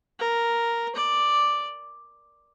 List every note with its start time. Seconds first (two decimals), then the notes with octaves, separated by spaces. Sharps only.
0.19 A#4
0.95 D5